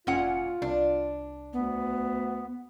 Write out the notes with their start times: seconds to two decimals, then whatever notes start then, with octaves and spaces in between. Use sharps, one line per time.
0.07 F1 A#2 C#4 F4 F#5
0.62 C2 D4
1.53 D2 B3